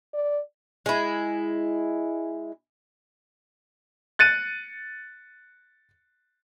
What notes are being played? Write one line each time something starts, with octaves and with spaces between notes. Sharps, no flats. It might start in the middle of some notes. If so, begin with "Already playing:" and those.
D5
G#3 E4
F#6 A6 C#7 D#7